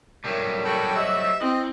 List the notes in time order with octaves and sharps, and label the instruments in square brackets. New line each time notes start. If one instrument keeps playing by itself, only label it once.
[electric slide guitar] F#3 G3 A3 [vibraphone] A#4 E5
[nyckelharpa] F#4 [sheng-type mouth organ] A4 G5 B5
[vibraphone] G4 C5 D#5 [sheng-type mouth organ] E5 E6
[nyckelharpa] C4 [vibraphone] E4 E6 [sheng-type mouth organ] D#5